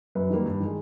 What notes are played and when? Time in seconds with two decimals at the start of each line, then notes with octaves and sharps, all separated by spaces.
0.15 F#2 B4
0.30 D#3 G3 A#3
0.46 G2
0.60 D#3 G#3